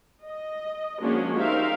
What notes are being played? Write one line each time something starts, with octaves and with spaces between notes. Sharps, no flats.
D#5
F3 G#3 A#3 C#4 D4 F#4
D#4 G4 A#4 C5 E5 F5